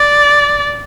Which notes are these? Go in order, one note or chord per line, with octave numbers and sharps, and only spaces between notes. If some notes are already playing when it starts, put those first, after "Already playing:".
Already playing: D5